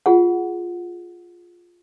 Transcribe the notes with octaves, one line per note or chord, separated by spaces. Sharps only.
F4 G#4 F#5